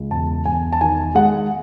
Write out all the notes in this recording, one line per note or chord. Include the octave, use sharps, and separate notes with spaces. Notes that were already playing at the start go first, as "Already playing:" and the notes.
Already playing: C#2
E1 A5
E1 G#5
A5
D#3 G#5
G#3 F#5